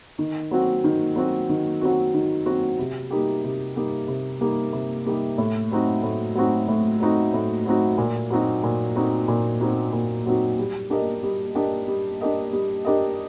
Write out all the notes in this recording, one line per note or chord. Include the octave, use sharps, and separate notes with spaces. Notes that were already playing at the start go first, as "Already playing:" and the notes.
D#3
F#3 C4 F#4
D#3
F#3 C4 F#4
D#3
F#3 C4 F#4
D#3
F#3 C4 F#4
C3
G3 A#3 D#4 G4
C3
G3 A#3 D#4 G4
C3
G3 A#3 D#4 G4
C3
G3 A#3 D#4 G4
A2
F#3 C4 D#4 F#4
A2
F#3 C4 D#4 F#4
A2
F#3 C4 D#4 F#4
A2
F#3 C4 D#4 F#4
A#2
F#3 C4 D#4 F#4
A#2
F#3 C4 D#4 F#4
A#2
F#3 C4 D#4 F#4
A#2
F#3 C4 D#4 F#4
G3
D4 G4 A#4 D#5
G3
D4 G4 A#4 D#5
G3
D4 G4 A#4 D#5
G3
D4 G4 A#4 D#5